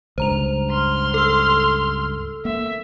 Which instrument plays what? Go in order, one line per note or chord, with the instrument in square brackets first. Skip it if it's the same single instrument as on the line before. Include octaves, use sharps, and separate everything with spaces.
[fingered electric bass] C#2 G2 [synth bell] C5 A#5 F7
[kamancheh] C6 F6
[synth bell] A4 E6
[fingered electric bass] A#3 [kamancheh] E5